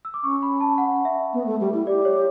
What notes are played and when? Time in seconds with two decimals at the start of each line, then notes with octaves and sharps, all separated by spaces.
0.05 E6
0.14 D6
0.24 C#4 C#6
0.43 B5
0.61 A5
0.78 F#5
1.05 E5
1.33 B3
1.46 A3
1.60 G3
1.73 E4
1.87 G4 D5
2.05 C#5